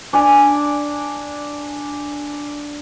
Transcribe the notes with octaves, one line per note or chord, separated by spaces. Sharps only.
D4 D5 G#5